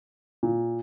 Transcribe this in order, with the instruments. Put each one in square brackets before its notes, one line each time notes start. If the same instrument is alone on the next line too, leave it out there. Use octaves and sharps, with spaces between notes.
[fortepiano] A#2